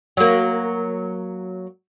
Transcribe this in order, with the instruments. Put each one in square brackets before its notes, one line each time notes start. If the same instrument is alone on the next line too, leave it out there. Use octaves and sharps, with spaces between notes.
[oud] F#3 A#3